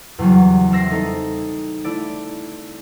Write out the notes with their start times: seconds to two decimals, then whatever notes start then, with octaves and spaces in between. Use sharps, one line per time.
0.19 E2 C#3 F#3 G3
0.71 G3 C4 E5 A#6 C7
0.90 D#4 A4 D#5
1.84 A3 E4 D5